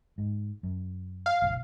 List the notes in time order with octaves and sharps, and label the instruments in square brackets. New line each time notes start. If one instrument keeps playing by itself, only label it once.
[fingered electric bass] G#2
F#2
[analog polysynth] F5
[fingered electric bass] F#1 B1